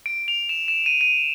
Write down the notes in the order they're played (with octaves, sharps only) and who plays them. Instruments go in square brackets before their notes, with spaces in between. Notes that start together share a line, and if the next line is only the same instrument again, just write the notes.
[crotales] D7
F7
E7
E7
D#7
D#7